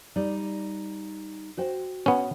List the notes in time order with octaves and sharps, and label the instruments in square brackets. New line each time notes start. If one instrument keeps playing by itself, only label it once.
[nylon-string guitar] G3 D#4 D5
F#4 C5 G5
[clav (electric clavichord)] B3 C#4